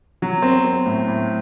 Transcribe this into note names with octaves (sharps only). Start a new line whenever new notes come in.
F#3
C4
C4
A2
A2